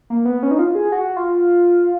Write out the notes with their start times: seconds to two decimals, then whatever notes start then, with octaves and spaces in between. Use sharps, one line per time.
0.10 A#3
0.25 B3
0.43 C#4
0.51 D#4
0.59 F4
0.75 G#4
0.92 F#4
1.16 F4